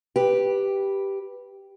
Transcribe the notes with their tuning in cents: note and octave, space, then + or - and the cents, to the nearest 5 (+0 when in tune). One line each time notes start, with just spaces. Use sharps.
G4 +0 B4 -5